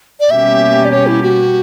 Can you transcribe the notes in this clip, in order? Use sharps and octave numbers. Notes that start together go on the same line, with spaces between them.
D5
B2 G3 A#3 C#4 G4 E5
D5
C#5
E4
F#4